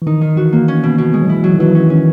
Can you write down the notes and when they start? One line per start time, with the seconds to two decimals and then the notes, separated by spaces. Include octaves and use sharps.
0.02 E3
0.07 D#3 D#4
0.21 D#3
0.37 E3 F#4
0.53 A#3
0.68 C#4
0.83 B2
0.98 B2
1.14 G#3
1.23 F#3
1.28 E3 E4
1.44 F#3
1.53 D#3
1.59 E3 F#3
1.75 C#4
1.90 D#3 C#4